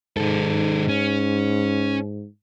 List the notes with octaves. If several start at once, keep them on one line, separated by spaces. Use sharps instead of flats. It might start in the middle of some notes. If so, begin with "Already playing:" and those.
G#2 D#3 A4
C#4